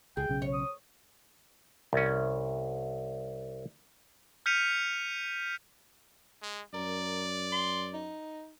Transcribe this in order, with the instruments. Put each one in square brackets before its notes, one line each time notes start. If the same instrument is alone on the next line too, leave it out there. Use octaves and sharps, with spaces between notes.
[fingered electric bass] C#2 [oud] G#4 [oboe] G5
[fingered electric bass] B1 C#3
[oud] C#5
[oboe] D#6
[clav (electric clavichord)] C2 C#4
[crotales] F6 G6 B6 C#7 D#7 F7
[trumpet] G#3
[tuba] F#2 [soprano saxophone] A#4 [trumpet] D5
[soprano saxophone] C6
D#4